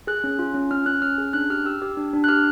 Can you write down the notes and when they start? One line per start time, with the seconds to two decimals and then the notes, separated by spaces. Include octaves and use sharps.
0.07 G#4 F#6
0.24 C#4
0.39 F4
0.54 C#4
0.71 C#4 F6
0.86 C#4 F#6
1.02 C#4 F6
1.18 G#4
1.33 D4 F#6
1.50 G4 F6
1.65 G4 E6
1.82 G4
1.97 D4
2.13 D4
2.24 F#6
2.28 G4 F6